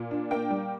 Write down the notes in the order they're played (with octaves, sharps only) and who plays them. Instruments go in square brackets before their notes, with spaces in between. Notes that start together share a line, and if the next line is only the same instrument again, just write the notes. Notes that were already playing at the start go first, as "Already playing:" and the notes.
Already playing: [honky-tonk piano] A#2
D4
A#3 G5
G3